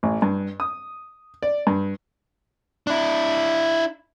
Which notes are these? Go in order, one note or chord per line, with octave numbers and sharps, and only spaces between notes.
A1
G2
D#6
D5
G2
D4 E4